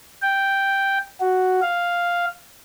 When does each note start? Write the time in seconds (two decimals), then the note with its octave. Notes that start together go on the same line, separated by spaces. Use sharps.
0.22 G5
1.21 F#4
1.62 F5